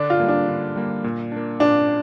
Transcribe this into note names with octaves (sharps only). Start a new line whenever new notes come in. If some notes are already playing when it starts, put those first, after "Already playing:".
Already playing: D3 D4
F4
G3 A#3
D4
D3
G3 A#3
A#2
A#3 D4
A#2 D4